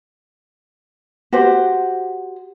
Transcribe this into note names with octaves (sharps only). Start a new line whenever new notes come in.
F#4 G4 C5